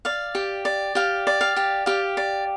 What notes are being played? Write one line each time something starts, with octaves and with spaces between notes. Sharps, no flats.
D5 F5
G4
D5
G4 F5
D5
F5
G4
G4 F5
D5